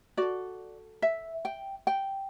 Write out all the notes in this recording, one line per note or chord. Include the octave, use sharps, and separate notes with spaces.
F#4 A4 D5
E5
G5
G5